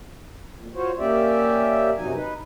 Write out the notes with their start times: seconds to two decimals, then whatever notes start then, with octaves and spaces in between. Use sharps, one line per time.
0.57 F2 A#2
0.75 F4 F#4 C5 C#5
0.99 A#3 C#4 G4 D5 E5
1.97 F#2 C3 F#3 D#4 G#5
2.14 D#4 B4